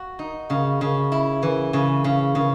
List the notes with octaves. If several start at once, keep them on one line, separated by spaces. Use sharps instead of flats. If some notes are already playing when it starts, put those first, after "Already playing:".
Already playing: F#4
D#4
C#3
C#3
E4
E3
C#3
C#3
C#3